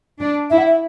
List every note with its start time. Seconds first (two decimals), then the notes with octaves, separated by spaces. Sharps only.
0.20 D4
0.50 E4 E5
0.58 F#5
0.65 E5